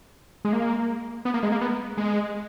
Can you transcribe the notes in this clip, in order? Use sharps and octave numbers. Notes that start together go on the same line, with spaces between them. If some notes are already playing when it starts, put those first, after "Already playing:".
G#3
A#3
B3
A#3
G#3
A#3
B3
G#3